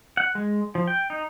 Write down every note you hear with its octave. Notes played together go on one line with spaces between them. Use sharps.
F#5
G#3
F3
G5
D#4